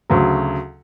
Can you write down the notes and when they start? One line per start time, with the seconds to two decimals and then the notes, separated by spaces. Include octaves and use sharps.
0.10 D2 C#3 F#3